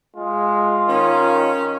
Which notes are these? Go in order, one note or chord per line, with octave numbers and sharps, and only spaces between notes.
G#3 F4
D#3 C#4